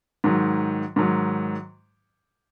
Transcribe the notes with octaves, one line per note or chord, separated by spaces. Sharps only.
G#2 D#3 F#3
G#2 D#3 F#3